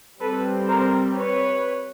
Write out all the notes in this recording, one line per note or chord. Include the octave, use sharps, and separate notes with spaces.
G3 C4 A4 B4
A#4 C5
B4 C#5